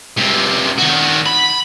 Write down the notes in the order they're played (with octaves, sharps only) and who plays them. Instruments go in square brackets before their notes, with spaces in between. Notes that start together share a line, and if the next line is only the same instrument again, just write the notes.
[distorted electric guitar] C#2 C3
D#3 F#4
B5